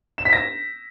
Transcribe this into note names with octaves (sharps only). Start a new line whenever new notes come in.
E7
B6
A#6